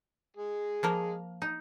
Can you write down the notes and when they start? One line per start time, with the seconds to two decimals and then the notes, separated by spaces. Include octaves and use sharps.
0.37 G#3 G#4
0.83 F3 A#3 A#4
1.42 D#4